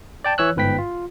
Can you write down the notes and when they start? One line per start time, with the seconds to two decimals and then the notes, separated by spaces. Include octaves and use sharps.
0.24 D5 G5 A5
0.38 E3 C#5 E6 F#6
0.56 G1 G#2 B4 G5 B6
0.78 F4